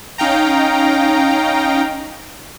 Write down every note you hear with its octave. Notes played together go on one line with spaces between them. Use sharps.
C#4 D#4 F5 G5 A#5